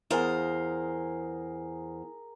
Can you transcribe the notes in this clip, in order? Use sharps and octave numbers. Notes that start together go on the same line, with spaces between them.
E2 G#4 A#4 C5 F5